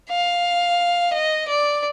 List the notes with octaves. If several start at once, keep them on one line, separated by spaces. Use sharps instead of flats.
F5
D#5
D5